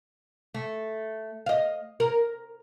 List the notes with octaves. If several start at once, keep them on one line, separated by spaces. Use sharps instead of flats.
A3
D#5 F5
A#4